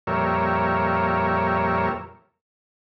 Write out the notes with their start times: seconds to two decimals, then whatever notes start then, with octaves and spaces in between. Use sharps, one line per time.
0.07 F2 A#2 G3 A#4 C#5 E5